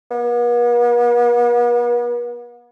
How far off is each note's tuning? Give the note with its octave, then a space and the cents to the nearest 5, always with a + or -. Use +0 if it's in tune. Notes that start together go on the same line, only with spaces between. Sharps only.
B3 -45